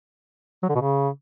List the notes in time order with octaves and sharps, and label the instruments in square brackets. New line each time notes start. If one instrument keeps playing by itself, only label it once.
[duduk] F#3
D3
B2
C#3